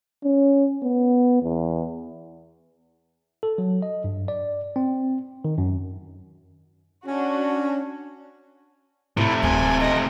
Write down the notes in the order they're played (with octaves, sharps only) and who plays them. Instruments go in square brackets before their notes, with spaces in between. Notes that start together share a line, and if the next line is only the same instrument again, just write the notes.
[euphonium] C#4
B3
E2
[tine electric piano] A4
F#3
D#5
G2
D5
C4
D#3
F#2
[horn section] C#4 [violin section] D4 F#4
[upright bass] A2 [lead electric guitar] C3 A3 [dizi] E4
[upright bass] D1 C4 [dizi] G#5
[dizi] D#5